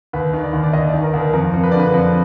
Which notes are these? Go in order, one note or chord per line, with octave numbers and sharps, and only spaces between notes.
D#2 B4
D#3
D5
D#2
D5
D#2 D#5
D5
D#3
A#4
D#2
A#4
F2 A#4
F2
B4
D3 D5
B4
F2